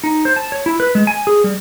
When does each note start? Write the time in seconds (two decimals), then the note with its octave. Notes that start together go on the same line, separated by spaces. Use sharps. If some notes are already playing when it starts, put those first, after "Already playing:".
0.04 D#4
0.25 C5
0.36 A5
0.52 C#5
0.66 E4
0.80 B4
0.95 G#3
1.07 G#5
1.27 G#4
1.44 G3